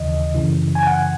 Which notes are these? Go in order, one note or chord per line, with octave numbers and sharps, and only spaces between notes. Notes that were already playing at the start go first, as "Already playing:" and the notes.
Already playing: D#2 C#3 E3 D#5
F#2 C#3 E3
G#5
F#5